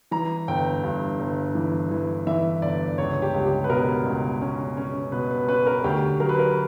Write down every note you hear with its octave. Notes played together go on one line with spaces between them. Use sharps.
E3 A#5
G1 G5
G2
G1
E3
E3
E3 E5
G1 D5
C#2 C#5
G4
C#2
G4
B4
B2 A#4
C#2
C#4
C#4
B2 B4
B4
C#4 B4
A#4
D2 G4
F#3 A#4
B4
A#4